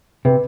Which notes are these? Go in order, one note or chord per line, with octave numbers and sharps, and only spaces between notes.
C3 B4